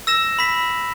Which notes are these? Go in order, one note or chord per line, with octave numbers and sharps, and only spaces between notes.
E6 A#6 E7
B5 B6